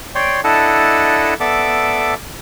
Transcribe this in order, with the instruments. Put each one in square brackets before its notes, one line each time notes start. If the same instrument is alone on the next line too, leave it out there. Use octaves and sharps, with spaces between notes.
[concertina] C#5 D5 G5 C6
D4 E4 A4 D#5 F#5 A5
B3 A4 D5 E5 D6